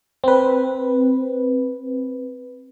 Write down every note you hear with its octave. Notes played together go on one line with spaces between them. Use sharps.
C4 B4